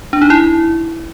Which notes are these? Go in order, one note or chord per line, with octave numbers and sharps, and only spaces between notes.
D4
D#4
E4